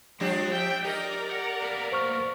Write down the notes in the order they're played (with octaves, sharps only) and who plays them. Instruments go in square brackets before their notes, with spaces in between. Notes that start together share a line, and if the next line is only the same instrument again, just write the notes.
[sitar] F3 D4 G4 [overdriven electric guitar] G#3
[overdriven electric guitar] E5 [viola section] G5
[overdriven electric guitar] D#4 [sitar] G4 [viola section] A#4 D5
[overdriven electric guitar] F#5
A#3 B3
[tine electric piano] C5 C#6 F6